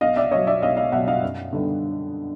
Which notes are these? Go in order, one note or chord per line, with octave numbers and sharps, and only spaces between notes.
B1 D#5 F5
D5 E5
B2 F#3 C#5 D#5
D5 E5
B1 D#5 F5
D#5 F5
B2 F#3 E5 F#5
D#5 F5
F#2
D3 G3 B3 D#4